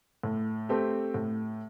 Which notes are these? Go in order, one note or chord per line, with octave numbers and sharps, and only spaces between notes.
A2
A3 C4 G4
A2